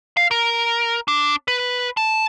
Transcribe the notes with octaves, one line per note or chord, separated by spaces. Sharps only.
F5
A#4
D4
B4
A5